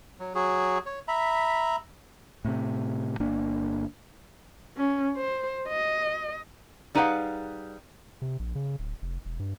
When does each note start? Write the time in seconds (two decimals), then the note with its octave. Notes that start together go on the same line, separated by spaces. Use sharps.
0.19 F#3
0.35 F#3 F#4 G#4
0.86 C#5
1.08 E5 A#5 B5
2.45 A2 C3
3.20 G1 A#3 D4
4.77 C#4
5.16 C5
5.69 D#5
6.95 G3 D#4 G#4 B4 F5 F#5
8.22 C3
8.39 A#1
8.55 C#3
8.79 D1
9.02 F1
9.25 E1
9.39 G2